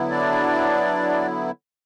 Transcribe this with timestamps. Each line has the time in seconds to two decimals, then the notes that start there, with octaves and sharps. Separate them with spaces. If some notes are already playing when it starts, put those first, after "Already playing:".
Already playing: D3 F#3 B3 E4
0.11 D4 D5